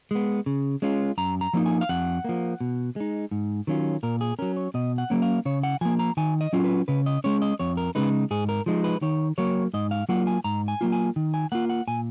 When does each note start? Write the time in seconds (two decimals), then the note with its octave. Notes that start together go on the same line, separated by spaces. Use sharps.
0.11 G#3 B3
0.46 C#3
0.82 G#3 C#4 F4
1.18 F#2 A#5
1.41 A#5
1.53 F3 A#3 D#4
1.66 G#5
1.81 F5
1.89 F2 F#5
2.25 F3 A#3
2.61 B2
2.96 G#3 D#4
3.31 G#2
3.67 D#3 F#3 C#4 F4
4.03 A#2 A#4
4.21 G#4
4.39 F#3 C#4 A#4
4.57 C#5
4.74 B2 D#5
4.98 F#5
5.10 F#3 A#3 C#4
5.22 F5
5.45 C#3 C#5
5.63 F#5
5.81 F3 A#3 G#5
5.99 A#5
6.17 D#3 G#5
6.41 D#5
6.53 F#3 C#4 F4
6.64 B4
6.88 C#3 B4
7.06 D#5
7.24 G#3 C#4 C#5
7.42 D#5
7.59 F2 C#5
7.77 A#4
7.95 C#3 G#3 D#4 B4
8.31 G#2 G#4
8.49 A#4
8.66 F3 G#3 D#4
8.84 B4
9.02 D#3 C#5
9.38 F#3 A#3 C#5
9.74 G#2 D#5
9.91 F5
10.09 F#3 A#3 F4 F#5
10.27 G#5
10.44 G#2 A#5
10.68 G#5
10.81 F#3 A#3 F4
10.92 G#5
11.16 D#3
11.34 G#5
11.52 A#3 F4 F#5
11.70 F#5
11.87 A#2 G#5